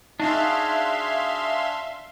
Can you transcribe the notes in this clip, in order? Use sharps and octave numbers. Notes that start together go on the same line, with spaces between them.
D4 D#4 F#4 G#4 E5 F5 C6